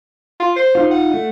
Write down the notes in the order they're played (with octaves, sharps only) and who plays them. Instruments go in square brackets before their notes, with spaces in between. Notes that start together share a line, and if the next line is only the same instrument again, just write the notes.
[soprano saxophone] F4
C5
[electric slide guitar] D#4 F4
[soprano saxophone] F#5
[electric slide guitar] A3